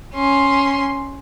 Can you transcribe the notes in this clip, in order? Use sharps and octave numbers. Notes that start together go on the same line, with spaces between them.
C#4 C6